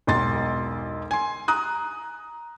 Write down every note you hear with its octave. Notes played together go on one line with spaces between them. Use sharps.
E1 B1 C6 A6
G#5 C6
A#5 D#6 F#6